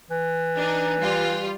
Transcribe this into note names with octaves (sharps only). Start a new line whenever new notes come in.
E3
D4 D#4
G3 F4